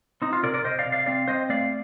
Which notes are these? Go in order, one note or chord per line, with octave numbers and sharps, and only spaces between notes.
C4 D#4
F4
C3 A#4 D5
A#4 D5
C3 C5 D#5
D5 F5
C3
D5 F5
C4 D5 F5
C4 C5 D#5
A3 D5 F5